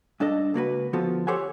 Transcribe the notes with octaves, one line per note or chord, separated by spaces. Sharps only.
G2 D4 A4 D#5
C#2 A#3 F#4 B4
D3 F3 B3 F4 F#4 A4
G4 A4 C5 C#5 F#5 G#5